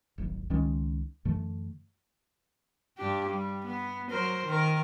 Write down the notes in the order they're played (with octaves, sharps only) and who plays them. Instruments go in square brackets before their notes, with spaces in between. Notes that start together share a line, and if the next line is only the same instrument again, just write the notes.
[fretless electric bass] D1 G#1 D#2
C#2 D#3 G#3 C#4
F#2 D3 E3 A3
[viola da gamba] G2 D4 G4
G3
B3
F#3 A#4 C5
D#3 A#4